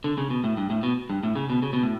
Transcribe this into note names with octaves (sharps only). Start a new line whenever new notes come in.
D3
C#3
B2
A2
G2
A2
B2
G2
A2
C#3
B2
C#3
B2
A2